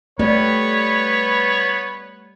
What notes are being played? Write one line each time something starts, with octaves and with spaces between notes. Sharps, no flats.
G3 A3 B3 B4 C#5